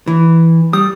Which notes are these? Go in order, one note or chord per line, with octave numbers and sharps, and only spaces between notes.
E3
G3 D#6